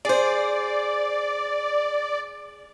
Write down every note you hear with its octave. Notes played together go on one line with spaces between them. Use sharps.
G#4 C5 D5